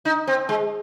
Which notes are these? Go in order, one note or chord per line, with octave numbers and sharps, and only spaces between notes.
D#4
C4
G#3